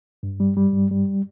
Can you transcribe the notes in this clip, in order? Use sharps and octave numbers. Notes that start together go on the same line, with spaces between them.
G2
G3
G3
G2
G3